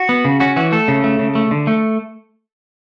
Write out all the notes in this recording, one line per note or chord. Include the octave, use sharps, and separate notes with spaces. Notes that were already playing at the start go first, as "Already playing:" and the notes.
Already playing: F#4
B3
C#3
C#4 F#4
E3 F#4
A3 A4
C#3
A3
C#3
A3
D3
A3